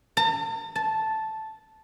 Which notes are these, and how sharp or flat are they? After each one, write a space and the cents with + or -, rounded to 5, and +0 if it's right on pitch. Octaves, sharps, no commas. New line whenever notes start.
A5 +45
A5 -5